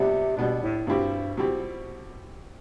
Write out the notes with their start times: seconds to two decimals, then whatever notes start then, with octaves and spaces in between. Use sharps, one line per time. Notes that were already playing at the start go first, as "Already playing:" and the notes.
Already playing: C3 G3 B3 D4
0.37 B2 G3 B3 D4
0.63 A2
0.87 G2 B2 G3 C4 E4 G4
1.37 B2 G3 C4 E4 G4